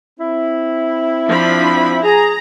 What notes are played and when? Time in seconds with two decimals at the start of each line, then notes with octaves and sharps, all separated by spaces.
0.20 C4 E4
1.28 F3 D4 B5
2.04 G#4 A#5